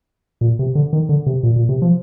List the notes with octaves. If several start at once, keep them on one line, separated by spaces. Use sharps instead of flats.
A#2
C3
D3
D#3
D3
C3
A#2
A#2
C3
F3